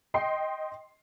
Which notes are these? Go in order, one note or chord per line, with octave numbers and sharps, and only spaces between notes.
D#5 G5 C6 C7